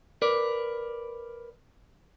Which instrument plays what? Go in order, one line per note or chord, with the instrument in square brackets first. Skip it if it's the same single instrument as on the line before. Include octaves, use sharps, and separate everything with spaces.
[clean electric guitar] A#4 B4 D5